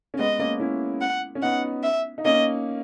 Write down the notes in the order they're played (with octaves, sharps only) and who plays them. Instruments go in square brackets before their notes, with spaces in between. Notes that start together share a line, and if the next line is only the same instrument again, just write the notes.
[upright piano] C#4
[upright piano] G#3 B3 [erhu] D#5
[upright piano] A#3 C#4
C#4 E4
[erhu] F#5
[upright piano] C#4
[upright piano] B3 D#4 [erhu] F#5
[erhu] E5
[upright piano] D#4
[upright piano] A#3 C#4 [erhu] D#5